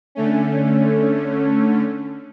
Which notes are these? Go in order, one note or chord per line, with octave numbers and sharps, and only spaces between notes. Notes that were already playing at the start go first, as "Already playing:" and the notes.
D3 A3 C#4